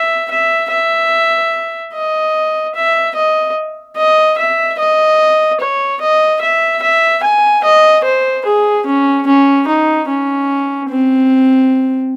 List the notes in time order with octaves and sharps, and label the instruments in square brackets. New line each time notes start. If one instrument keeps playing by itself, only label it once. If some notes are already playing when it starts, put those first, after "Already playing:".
Already playing: [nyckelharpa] E5
E5
E5
D#5
E5
D#5
D#5
E5
D#5
C#5
D#5
E5
E5
G#5
D#5
C5
G#4
C#4
C#4
D#4
C#4
C4